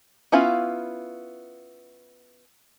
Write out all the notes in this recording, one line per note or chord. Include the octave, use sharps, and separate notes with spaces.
B3 C#4 E4 F4 F5